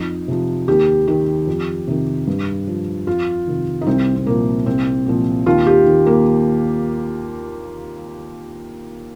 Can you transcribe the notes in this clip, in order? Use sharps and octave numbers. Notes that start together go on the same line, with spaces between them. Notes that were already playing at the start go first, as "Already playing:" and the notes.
Already playing: F2 D#4
C3 F3
D#2 G4
D#3 G4
F2
C3 D#3
G2
F3
F2 F4
C3 D#3
D#4
C2 C4
C4
A#2 F3 A#3
C2 C4
A#2 F3
D#2 F4
G4
D#3
A#3